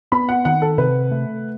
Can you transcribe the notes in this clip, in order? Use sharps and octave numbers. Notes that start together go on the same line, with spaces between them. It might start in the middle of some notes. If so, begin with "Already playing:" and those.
B3 B5
F#5
D#3 F#5
A4
C3 B4
A3